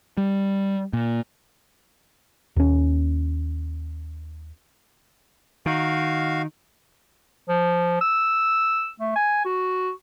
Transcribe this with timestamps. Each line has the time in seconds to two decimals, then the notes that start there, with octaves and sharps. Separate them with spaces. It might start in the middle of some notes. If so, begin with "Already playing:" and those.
0.17 G3
0.93 A#2
2.56 D#2 C#4
5.66 D#3 F#4 F5
7.49 F3
8.01 E6
9.00 A3
9.16 G#5
9.45 F#4